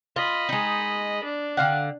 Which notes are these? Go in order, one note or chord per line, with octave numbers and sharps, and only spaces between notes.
F4 D#5 B5
G#3 D#4
D4
D3 F5 F#5